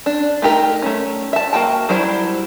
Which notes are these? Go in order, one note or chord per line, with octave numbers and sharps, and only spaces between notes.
D4
A3 D#4 G4 A#4
A3 C#4
E5 A5
A#3 F#4 G5 A5
F#3 G3 E4 C5